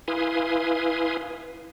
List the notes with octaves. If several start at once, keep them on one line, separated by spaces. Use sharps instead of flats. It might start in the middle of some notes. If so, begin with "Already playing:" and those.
E4 B4 F5 G#5 C6 D#6